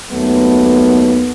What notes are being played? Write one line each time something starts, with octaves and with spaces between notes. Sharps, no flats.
D#2 F#3 A3 B3